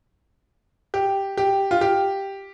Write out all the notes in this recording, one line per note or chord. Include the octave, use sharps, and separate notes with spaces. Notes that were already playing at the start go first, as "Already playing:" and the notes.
G4
G4
F4
G4